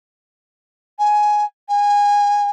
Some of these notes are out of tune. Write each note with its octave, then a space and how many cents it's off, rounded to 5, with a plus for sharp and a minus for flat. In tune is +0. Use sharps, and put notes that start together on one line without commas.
G#5 +10
G#5 -20